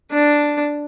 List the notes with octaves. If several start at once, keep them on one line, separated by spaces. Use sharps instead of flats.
D4